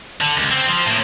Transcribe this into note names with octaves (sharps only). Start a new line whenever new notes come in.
D3
C#2
C4
F3
A2 A#3